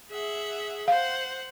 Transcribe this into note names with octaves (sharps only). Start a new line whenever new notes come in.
G#4 E5 F#5
C5 F5 F#5